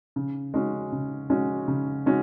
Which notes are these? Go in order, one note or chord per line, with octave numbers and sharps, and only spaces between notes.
C#3
G#3 C#4 F#4
C#3
G#3 C#4 F#4
C#3
G#3 C#4 F#4